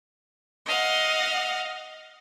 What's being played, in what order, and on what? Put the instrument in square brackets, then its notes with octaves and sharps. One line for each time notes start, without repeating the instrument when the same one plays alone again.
[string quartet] D#5 F5 F#5